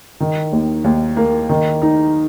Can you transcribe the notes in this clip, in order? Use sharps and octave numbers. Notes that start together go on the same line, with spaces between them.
D#3
D#2
D#2
A#3
D#3
D#4